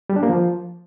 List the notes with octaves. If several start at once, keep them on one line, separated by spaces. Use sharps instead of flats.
G3
D4
A#3
F3